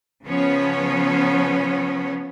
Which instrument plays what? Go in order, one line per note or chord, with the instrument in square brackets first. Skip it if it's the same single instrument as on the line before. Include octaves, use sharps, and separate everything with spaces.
[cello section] C#3 F3 B3 C#4 C#5